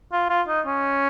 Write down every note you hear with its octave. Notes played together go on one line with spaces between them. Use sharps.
F4
F4
D#4
C#4